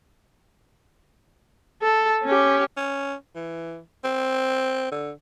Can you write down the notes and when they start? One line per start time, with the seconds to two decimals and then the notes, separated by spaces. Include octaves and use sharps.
1.82 A4
2.24 C#4 G4
2.77 C#4
3.35 E3
4.04 C4
4.91 D3